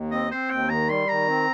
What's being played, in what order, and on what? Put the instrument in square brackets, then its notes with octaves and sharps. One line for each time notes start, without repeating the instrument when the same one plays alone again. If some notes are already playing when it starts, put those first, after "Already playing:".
Already playing: [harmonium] D#2
[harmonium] C4 [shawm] D#5
[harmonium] C4 [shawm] C5
[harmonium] D#2 [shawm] G5
[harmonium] D#3 [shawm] A#5
[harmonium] G3 [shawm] C6
[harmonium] D#3 [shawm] A#5
[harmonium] C4